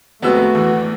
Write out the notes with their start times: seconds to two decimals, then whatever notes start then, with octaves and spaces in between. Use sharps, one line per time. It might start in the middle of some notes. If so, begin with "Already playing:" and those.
0.22 F1 G#3 A3 B3 C4 F#4 E6
0.55 E2 E3